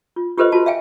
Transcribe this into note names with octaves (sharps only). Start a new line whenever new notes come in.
F4
F4 G4 A4 B4 C5 D#5
F4 F#4 A5
E5 F5 G5 G#5